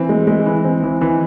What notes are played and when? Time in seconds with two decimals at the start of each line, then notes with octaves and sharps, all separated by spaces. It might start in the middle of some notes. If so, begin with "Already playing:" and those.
Already playing: E3 C4
0.09 G#3
0.27 G#3
0.46 E3
0.64 C4
0.83 E3
1.01 E3